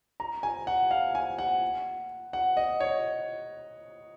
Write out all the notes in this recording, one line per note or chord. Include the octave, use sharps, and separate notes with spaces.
A#5
G#5
F#5
F5
G#5
F#5
F#5
D#5
C#5